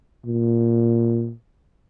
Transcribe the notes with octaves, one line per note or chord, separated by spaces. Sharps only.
A#2